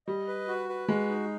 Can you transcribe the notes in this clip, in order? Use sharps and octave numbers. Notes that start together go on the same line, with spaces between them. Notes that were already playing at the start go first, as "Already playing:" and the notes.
G3 D#5
B4
F#4
B4
G#3 F#4
D#4